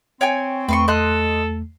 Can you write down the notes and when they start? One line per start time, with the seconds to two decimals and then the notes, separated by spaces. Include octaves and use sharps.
0.21 C4 C#5 G5 G#5
0.69 E2 A3 B4 C6 C#6
0.88 A4 D#5 C6 F#6